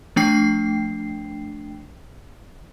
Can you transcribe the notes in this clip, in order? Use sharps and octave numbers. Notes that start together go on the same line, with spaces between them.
F3 A3 D4 G5 C7